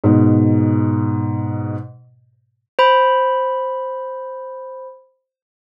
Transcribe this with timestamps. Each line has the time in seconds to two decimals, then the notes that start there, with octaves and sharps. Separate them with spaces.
0.04 G#2 B2
2.79 C5 B5